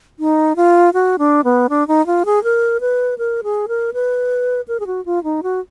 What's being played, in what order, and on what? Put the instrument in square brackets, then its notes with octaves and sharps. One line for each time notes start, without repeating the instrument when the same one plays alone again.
[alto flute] D#4
F4
F#4
D4
B3
D4
D#4
F4
G#4
A#4
B4
A#4
G#4
A#4
B4
A#4
G#4
F#4
F4
D#4
F#4